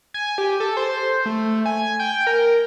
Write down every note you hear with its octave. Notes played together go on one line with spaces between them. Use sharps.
G#5
G4
A4
C5
A3
G#5
G5
A#4